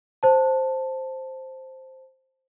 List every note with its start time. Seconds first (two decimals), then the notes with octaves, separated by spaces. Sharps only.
0.23 C5 A5